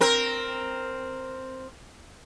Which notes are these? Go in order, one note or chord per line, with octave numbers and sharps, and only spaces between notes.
C4 A#4